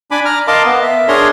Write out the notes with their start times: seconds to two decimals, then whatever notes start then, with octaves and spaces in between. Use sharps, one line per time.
0.11 D4 G#5 B5 D6
0.25 A#5 F6
0.48 A#4 D#5 F5 A5 C6 D6
0.65 B3
0.83 E5
1.08 D4 G#4 A#4 C#5 A#5 C6